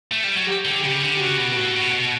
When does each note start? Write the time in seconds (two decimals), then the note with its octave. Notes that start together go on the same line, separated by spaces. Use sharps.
0.12 A3
0.24 G3
0.35 F#3
0.47 G4
0.65 D3
0.84 C#3 G4
1.02 D3
1.20 C#3 F#4
1.38 B2
1.56 A2 F#4
1.75 B2
1.93 B2